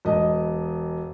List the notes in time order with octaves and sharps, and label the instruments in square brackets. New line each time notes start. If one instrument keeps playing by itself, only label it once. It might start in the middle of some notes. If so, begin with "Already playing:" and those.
[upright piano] E1 D#5